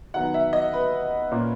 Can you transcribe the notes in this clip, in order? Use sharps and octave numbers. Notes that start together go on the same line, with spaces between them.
D#3 F#3 B3 F#5
E5
D#5
B4
A#2 A#3 C#4